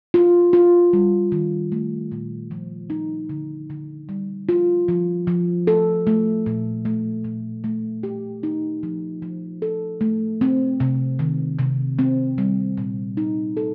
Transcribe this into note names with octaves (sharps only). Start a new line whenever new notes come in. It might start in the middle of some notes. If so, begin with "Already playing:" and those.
F4
F4
G3
D#3
A3
A#2
F3
D#4
D3
D3
G3
F4
F3
F3
A4
A3
A#2
A3
A#2
A3
G4
D#4
F3
F3
A4
A3
C4
C3
D#3
C3
C4
G3
A#2
D#4
A4